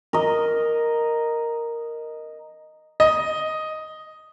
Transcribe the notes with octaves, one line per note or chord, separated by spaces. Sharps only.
A#4 D#5
D#5